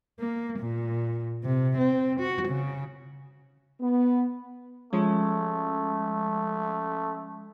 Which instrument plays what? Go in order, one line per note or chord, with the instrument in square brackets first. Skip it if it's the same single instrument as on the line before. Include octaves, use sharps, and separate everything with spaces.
[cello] A#3
A#2
C3
C4
F#4
C#3
[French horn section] B3
[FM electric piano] F3 G#3 C#4 [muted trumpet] A3